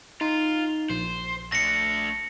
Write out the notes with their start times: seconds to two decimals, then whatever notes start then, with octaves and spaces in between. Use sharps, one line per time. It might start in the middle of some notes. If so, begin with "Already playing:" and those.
0.21 D#4 F4
0.90 A#1 C5
1.52 A3 D4 A#6 C#7